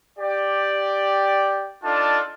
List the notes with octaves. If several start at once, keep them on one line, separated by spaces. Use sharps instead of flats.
G4 D5
D4 D#4 F4 A4 D5 A5